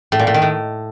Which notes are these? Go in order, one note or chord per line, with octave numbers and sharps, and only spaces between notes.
A2
A#2
A2
D#3
A2